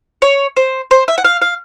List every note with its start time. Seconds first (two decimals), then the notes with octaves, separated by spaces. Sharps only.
0.22 C#5
0.57 C5
0.91 C5
1.08 E5
1.18 F#5
1.25 F5
1.42 F5